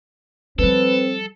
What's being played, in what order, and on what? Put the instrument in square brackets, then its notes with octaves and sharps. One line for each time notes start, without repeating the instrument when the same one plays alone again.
[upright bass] F3 G3 [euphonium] C4 [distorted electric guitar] A4 [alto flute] B4